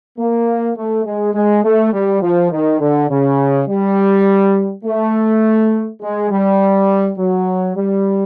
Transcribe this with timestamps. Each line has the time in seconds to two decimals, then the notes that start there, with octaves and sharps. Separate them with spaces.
0.18 A#3
0.76 A3
1.06 G#3
1.34 G#3
1.64 A3
1.93 G3
2.22 F3
2.52 D#3
2.80 D3
3.10 C#3
3.68 G3
4.85 A3
6.01 G#3
6.31 G3
7.18 F#3
7.77 G3